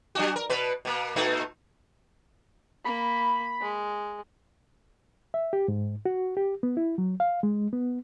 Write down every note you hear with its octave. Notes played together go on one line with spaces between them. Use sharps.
F#3 D4 F#4
A#4
B2 B4
B2 A#3
A#2 A3 D#4
A#3 B5
G#3
E5
G4
G#2
F#4
G4
B3
E4
F#3
F5
G#3
B3